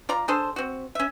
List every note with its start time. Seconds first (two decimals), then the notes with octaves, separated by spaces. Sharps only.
0.09 F4 D5 A#5
0.28 D4 G#4 A4 C5
0.56 C4 F#4
0.95 C#4 E5